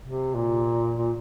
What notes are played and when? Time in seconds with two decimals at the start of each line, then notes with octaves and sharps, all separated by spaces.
0.05 C3
0.35 A#2
0.97 A#2